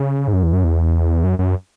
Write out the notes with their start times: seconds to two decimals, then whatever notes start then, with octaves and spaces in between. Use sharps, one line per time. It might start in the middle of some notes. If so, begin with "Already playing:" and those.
Already playing: C#3
0.28 G#2
0.33 F#2
0.43 E2
0.53 F#2
0.64 E2
1.24 F#2
1.39 F#2